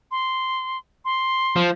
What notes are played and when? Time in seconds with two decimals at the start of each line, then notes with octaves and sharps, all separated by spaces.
0.11 C6
1.05 C6
1.56 F3